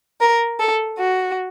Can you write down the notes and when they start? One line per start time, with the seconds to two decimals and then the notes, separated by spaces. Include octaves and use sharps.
0.21 A#4
0.59 A4
0.98 F#4